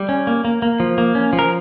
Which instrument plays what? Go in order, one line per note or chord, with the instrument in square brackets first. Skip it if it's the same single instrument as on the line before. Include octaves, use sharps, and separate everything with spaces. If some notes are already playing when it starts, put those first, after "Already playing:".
Already playing: [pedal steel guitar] G3
C#4
A#3
A#3
A#3
F3
A#3
C#4
F3
A#4